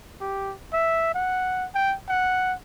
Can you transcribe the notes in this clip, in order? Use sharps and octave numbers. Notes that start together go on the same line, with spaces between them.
G4
E5
F#5
G5
F#5